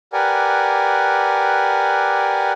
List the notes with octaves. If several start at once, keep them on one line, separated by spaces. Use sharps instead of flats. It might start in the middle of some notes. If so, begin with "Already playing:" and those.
G4 A#4 B4 D5 F#5 G#5